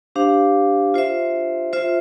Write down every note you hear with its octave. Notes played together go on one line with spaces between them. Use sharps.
D4 G4 C5 F5
F4 C5 E5
F4 C5 E5